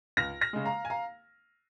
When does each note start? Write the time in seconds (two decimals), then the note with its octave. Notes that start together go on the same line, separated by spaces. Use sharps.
0.17 C#2 F6 A#6
0.41 F6 A#6
0.53 C#3 G#3
0.65 F5 A#5
0.85 G#5
0.90 F5 A#5